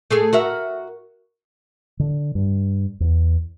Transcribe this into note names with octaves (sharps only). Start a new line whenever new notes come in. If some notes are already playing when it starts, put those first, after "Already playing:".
A3 G#4 A4
F#4 A#4 E5
D3
G2
E2